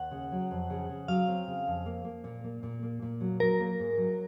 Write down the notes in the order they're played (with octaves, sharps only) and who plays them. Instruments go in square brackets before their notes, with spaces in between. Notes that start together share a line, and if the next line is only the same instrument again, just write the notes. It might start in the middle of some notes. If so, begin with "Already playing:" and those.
Already playing: [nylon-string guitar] D#2 [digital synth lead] F#5
[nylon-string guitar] C#3
F#3
F2
C#3
C#3
[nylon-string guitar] F#3 [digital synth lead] F5
[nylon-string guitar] C4
C#3
F2
A#3
A#3
A#2
A#3
A#2
A#3
A#2
F#3
[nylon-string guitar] F#3 [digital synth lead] A#4
[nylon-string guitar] A#3
G#2
F#3